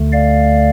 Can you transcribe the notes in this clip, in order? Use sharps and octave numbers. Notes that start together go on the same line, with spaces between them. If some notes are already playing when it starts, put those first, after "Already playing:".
Already playing: D2 D3 A3
D5 F5